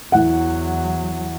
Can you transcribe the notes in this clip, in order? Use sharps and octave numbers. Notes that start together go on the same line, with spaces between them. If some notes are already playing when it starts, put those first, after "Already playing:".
E2 E3 F#3 F#5